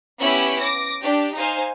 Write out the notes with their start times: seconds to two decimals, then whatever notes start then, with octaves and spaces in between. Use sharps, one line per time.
0.19 B3 C#4 E4 G4 B5
0.60 D6 A#6
1.02 D4 G4
1.36 D#4 C5 F5 G#5